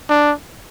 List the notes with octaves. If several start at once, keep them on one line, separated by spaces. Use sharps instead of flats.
D4